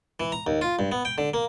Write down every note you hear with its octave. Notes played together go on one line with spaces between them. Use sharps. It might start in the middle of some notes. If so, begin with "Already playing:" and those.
E3
A#5
D#2
F4
G2
B3
G5
D3
A#3